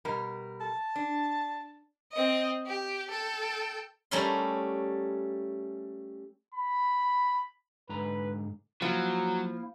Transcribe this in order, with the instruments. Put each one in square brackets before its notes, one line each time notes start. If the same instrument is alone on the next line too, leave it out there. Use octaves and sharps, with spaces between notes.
[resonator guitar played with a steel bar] B2 G3 A#4
[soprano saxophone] A5
[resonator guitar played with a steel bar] D4
[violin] C4 D#5
G4
A4 G5
[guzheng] G3 A3 C#4 A#4 B5 C6
[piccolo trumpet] B5
[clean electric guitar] G#2 D3 A#5 [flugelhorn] B4
[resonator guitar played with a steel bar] F3 [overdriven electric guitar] F#3 [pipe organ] A#3 E4